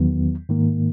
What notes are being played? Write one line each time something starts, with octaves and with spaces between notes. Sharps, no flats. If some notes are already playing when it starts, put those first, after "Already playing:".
Already playing: E2 D#3 F#3 B3
G#2 D#3 A#3